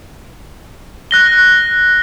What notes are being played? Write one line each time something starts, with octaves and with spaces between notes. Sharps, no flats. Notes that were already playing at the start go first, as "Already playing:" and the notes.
F#6 A#6 G7